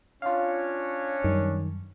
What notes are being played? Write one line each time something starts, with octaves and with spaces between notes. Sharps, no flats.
C#4 D4 F4 C#5 F5
F#2 D#3 G3